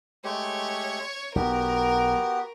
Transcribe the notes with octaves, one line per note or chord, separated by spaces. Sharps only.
G#3 A3 G4 C#5
B1 B3 F#4 G4 A#4